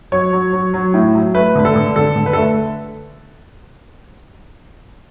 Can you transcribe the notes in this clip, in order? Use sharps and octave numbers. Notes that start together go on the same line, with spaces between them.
F#3 C#5
F#3
F#3
F#3
A2
F#3
A3 B4
D3 B4
A4
D3
D3 A4
D3
B4
A4
A3